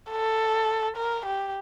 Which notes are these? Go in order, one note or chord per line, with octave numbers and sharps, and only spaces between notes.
A4
A#4
G4